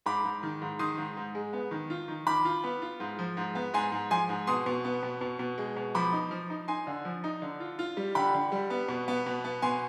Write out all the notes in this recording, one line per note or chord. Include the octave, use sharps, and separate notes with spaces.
G#2 B5 D6
G#2
D#3
G#2
D#3 C6 D#6
G#2
G#2
G#3
B3
D#3
F4
D#3
D#3 B5 D6
F4
B3
F4
G#2
F3
G#2
B3
G#2 G#5 C6
G#2
F3 G#5 C6
G#2
B2 C6 D#6
B2
B3
B2
B2
B2
G#3
B2
F3 B5 D6
D#4
F3
D#4
D#4 G#5 C6
D3
F3
D#4
D3
F4
F4
G3
D3 G5 B5
D3
G3
B3
B2
B3
B2
B3
B2 G#5 C6